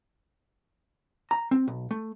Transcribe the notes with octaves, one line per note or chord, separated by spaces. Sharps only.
A#5
C4
B1
A3